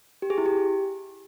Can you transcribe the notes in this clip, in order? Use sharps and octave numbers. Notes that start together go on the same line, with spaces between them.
G4
G#4
E4
G4